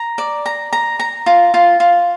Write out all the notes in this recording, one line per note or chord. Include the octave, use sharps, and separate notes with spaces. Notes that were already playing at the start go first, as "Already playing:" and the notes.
Already playing: A#5
D5
A#5
A#5
A#5
F4
F4
F4